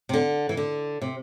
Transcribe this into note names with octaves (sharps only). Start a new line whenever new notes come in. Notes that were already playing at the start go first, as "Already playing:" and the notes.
C3
D3
E3
D3
C3